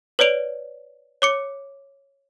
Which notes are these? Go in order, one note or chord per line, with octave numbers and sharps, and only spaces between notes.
B4 C#5 D5 D7 F7
C#5 D6 C#7